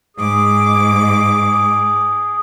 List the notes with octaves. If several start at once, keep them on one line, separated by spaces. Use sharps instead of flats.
G#2 G#4 D6